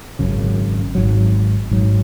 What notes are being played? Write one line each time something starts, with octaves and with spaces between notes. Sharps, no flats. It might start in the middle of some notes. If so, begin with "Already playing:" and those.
G#1 F#2 C#3
G#1 G#2 F#3
G#1 G#2 F#3